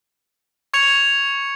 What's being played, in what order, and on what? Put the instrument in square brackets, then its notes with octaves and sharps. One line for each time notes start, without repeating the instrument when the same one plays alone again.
[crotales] C#6 G#6 C#7 F7